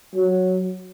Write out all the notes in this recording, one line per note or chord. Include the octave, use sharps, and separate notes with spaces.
F#3